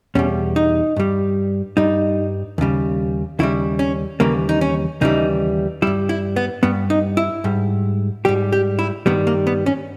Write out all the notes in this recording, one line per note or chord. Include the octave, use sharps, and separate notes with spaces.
E2 B2 G3 C#4
D#4
G2 G3
G2 G3 D#4
D#2 C#3 G3
D#2 C#3 G3 E4
C#4
D#2 C#3 E3 G3 A#3
D#4
C#4
D#2 C#3 E3 G3 D#4
G2 G3 E4
E4
B3
G2 G3 B3
D#4
E4
G#2 G3
G#2 G3 G4
G4
E4
G2 D#3 G3 B3
A#3
B3
C#4